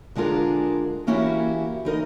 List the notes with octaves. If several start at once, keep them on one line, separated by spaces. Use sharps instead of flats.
D3 G#3 D4 F4 G#4 A#4
E3 A#3 C#4 E4 F#4 G4
E3 D#4 A#4 D#5